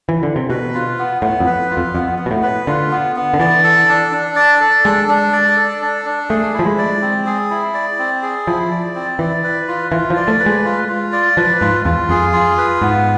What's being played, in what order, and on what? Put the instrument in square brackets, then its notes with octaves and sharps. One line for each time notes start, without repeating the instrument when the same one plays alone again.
[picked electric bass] E3
D3
C3
[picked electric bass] B2 [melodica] B4
[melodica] F4
B3
[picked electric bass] A2 [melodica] B3
[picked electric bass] F2
[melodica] B4
F4
[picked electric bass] F2
[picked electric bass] F2 [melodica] B3
[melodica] B3
[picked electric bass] B2
A2
[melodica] B4
[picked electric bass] D3 [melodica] F4
[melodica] B3
B3
[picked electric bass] D3
[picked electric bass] E3 [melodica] D5
[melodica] A4
D4
D4
D5
A4
[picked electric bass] G#3 [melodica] D4
[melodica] D4
D5
A4
D4
D4
[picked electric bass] A3 [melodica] G#4
[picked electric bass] F3 [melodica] E4
[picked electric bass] G#3
[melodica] D5
C4
G#4
E4
D5
C4
G#4
[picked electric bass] F3 [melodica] E4
[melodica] D5
C4
[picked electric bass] E3 [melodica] D5
[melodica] B4
F4
[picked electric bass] E3 [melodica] F4
[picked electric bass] F3
[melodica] D5
[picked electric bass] A3
[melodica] B4
[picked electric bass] G#3
[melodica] F4
F4
D5
[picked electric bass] F3 [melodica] B4
[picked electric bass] G#2 [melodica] F4
[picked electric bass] E2 [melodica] F4
[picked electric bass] F2 [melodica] G#4
[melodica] F4
B4
[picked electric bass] G#2 [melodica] B3